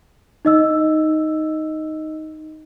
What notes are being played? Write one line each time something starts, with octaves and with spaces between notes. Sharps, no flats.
D#4 D#5 E6